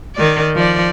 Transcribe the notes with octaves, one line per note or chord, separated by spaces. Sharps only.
D#3 D5
F3 D5